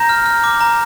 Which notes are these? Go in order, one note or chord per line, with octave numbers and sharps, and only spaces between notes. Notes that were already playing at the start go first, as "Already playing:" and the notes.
Already playing: A#5 G6 A#6
F6
F6
D6
A#5